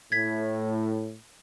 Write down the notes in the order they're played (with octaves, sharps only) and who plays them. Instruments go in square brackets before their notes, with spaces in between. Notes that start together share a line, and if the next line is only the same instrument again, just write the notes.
[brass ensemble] A2 [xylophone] G#6 B6